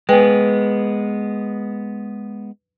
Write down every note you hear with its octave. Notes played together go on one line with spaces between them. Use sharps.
G#3 B3 B4 G5 G#5